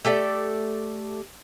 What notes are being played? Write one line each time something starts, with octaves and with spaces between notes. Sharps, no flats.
A3 G4 A4 D5